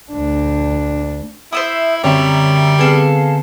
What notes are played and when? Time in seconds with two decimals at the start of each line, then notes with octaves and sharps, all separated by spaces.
0.12 D2 D4
1.52 E4 C5 E5 D#6
2.04 F#2 D3 G3 C4 C#5 E5
2.79 C3 B3 G#4 A4 F5